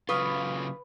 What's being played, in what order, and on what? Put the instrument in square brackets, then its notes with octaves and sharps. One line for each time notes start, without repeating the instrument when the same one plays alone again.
[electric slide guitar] C#3 F#3 F4 [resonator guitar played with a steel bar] B4 [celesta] C#6 D#6 F6